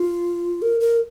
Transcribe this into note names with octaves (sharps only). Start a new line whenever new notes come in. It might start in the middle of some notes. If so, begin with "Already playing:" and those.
Already playing: F4
A#4
A#4